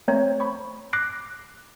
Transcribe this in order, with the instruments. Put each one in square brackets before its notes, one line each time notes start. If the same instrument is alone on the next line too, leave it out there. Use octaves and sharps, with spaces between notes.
[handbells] A3 C4 C5 C#5 A#5
B5 C#6
D6 F#6 A#6 C7 D7